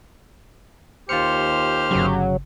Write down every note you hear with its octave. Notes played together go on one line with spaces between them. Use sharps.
D#2 F4 G4 C5 F6 C#7
G1 C#3 F#3